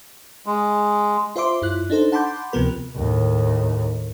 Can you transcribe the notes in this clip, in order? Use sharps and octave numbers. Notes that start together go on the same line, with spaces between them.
G#3
F4 C5 E5 C6 D6
F#2 E4 F4 F#6
D4 D#4 A4 C5
F#5 A5 B5 C6 D6 G6
D2 C3 F3 B3 A#4 B5
D#2 A2